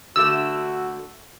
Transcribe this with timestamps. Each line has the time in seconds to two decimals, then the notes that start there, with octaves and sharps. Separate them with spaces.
0.16 D3 A3 F#4 E6